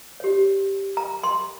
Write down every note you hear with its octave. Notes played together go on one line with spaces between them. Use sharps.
G4 C#5
A#5
C6